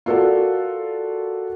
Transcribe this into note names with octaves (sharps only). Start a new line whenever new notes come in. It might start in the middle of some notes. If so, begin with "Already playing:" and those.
F4 F#4 A4 A#4 D5 F#5